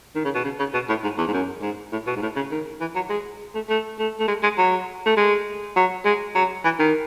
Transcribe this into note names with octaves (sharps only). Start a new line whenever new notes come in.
D#3
C#3
B2
C#3
C#3
B2
A2
G#2
E2
G#2
F#2
G#2
A2
B2
G#2
A2
C#3
D#3
E3
F#3
G#3
A3
A3
A3
A3
G#3
G#3
F#3
A3
G#3
F#3
G#3
F#3
E3
D#3